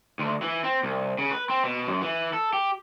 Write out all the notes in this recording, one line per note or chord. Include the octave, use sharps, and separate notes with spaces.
D2
E3
C4
C2
C#3
B4
C4
B2
F#2
E3
A4
G4